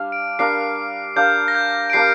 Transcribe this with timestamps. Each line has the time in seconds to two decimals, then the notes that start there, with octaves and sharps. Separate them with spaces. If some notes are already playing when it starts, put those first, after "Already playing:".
Already playing: G3 D4 F5
0.12 D7
0.39 G3 D4 A#4 F5 C7
1.16 G3 D4 A#4 F5 G6
1.48 A#6
1.55 G6
1.90 D7
1.93 G3 D4 A#4 F5 C7